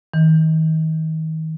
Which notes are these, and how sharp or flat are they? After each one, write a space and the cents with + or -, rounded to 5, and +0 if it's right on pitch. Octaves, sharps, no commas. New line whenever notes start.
D#3 +35